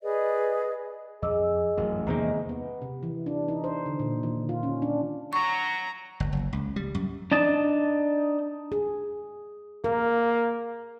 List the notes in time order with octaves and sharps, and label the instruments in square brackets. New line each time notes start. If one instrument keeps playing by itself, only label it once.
[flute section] G#4 B4 D5 D#5
[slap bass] F2 [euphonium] G#4 [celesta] D#5 D6 E6
[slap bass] A1 [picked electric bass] F#2
[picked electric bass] E2 C3 D#3 [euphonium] G#3 [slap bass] A#3 [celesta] A#5
[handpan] B3
C3
E3
D4
D#4
C5
D3
A#2
D#3
F4
C#4
D4
[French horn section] F#3 [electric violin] A#5 [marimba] C#6
[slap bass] G1
F#1
C#2
G3
F#2
[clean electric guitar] D4 D#4 A5
[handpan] G#4
[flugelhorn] A#3 [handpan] A#4